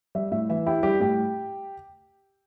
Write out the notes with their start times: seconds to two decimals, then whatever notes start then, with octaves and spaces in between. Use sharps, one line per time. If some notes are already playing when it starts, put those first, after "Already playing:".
0.15 G3 E5
0.31 A2 E5
0.49 E3 E5
0.66 E4 G4 G5
0.83 G3 G4 G5
1.00 A2 G4 G5